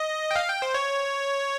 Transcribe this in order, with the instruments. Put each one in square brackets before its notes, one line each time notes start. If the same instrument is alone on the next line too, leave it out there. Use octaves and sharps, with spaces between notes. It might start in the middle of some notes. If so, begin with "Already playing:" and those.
Already playing: [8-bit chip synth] D#5
G5
F5
G5
C5
C#5